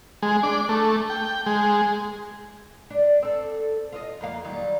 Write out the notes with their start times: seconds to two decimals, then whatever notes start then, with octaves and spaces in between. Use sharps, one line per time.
0.22 G#3
0.43 D4
0.69 A3
1.10 G5
1.46 G#3
2.90 D4
3.22 C4 A4
3.92 F4 D5 D#5
4.21 F2 A#3 F5
4.45 D#3 F#3 G3